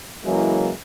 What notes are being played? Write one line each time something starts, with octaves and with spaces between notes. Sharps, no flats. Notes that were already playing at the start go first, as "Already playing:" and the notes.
C#3 E3 F#3 G#3 A#3 E4